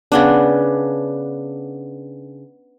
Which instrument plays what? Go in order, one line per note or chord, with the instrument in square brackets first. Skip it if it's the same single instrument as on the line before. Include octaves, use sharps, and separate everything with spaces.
[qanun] C#3 B3 D4